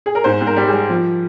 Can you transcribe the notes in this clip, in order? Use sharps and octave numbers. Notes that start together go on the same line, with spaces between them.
G#4
A#4
G#2 C5
G#2
A#4
G3
G#4
G3
F3